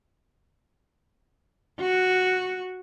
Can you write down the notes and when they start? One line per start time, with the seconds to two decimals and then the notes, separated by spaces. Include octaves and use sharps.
1.80 F#4